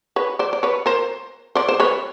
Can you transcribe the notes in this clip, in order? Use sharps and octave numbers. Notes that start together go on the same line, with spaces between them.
B4 C#5
C5 D5
D5
B4 C#5
A#4 C5
C5 D5
C5
B4 C#5